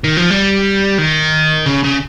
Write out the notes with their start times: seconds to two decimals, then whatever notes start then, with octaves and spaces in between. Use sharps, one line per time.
0.04 D#3
0.17 F3
0.30 G3
0.98 D#3
1.66 C#3
1.84 C#3